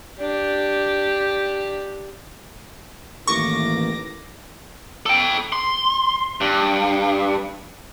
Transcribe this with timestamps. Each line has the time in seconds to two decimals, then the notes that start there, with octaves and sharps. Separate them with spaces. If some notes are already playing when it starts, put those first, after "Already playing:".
0.19 D4 G4
3.27 A1 D#3 E3 A#3 C#6 D6 A#6
5.06 A4 G5
5.52 C6
6.41 G2